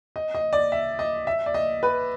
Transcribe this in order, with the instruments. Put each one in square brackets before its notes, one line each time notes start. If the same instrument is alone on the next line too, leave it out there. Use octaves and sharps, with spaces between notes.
[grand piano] D#5
D#5
D5
E5
D#5
E5
D5
D#5
B4